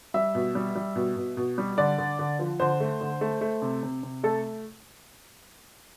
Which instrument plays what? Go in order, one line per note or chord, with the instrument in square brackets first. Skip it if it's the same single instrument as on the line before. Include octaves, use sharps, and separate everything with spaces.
[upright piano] G3 E5
B2
G3
G3
B2
B2
B2
G3
D3 D5
D3
D3
F3
D3 C5
A3
D3
A3
A3
C3
C3
C3
A3 A4